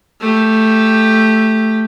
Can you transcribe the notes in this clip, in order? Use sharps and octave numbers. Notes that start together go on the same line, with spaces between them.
A3 G4